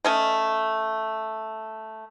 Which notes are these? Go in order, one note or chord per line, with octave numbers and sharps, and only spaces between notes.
A3 C#4 D#5